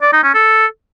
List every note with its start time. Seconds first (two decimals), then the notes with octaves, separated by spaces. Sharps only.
0.02 D5
0.13 D#4
0.24 C#4
0.35 A4